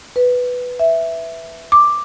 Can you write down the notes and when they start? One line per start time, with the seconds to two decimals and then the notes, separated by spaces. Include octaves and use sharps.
0.16 B4
0.79 E5
1.72 D6